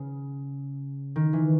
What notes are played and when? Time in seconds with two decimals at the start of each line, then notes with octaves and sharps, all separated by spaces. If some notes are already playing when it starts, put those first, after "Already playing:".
Already playing: C#3
1.16 D#3
1.33 E3